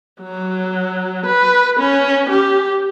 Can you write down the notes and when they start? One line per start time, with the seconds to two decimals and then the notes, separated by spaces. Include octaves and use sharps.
0.21 F#3
1.26 B4
1.80 C#4
2.30 G4